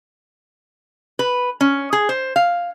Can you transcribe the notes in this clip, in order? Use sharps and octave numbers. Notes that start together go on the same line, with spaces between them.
B4
C#4
G#4
C5
F5